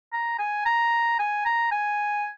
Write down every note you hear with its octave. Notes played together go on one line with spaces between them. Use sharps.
A#5
G#5
A#5
G#5
A#5
G#5